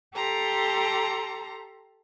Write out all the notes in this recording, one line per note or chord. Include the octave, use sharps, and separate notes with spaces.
G4 A4 A#5 C6